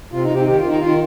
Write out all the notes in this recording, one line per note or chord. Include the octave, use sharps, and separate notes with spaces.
C3 F4
D#4
C3
G4
D#3 G4
F4
D#3
D#4
D#3 F4